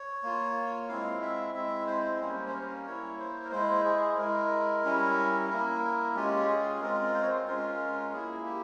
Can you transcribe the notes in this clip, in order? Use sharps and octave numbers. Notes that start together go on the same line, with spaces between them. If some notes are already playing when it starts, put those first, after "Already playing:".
Already playing: C#5
A#3 F4
G#3 C4 E4 F5
E5
G#3 C4 E4 E5
C5
G3 A#3 C#4 C5
C5
A#4
A#3 E4 C#5
C5
A#4
G#3 E4 C5
G#4
G#3 E4 A#4
G3 C#4 E4
A#3 E4 A#4
G#3 C#4 F4 G4
G#4
G#3 C4 F4 A#4
C5
C#5
C5
G#3 C#4 F4 A#4
A#3 E4 G#4
G4